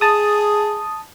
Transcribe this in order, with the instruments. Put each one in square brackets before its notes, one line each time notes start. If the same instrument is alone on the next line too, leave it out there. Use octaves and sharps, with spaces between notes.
[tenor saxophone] G#4 [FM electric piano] A5 D#6